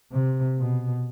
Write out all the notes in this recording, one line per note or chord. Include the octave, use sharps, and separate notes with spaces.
C3
B2